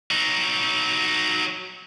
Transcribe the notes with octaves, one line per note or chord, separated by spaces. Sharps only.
F#3 D#4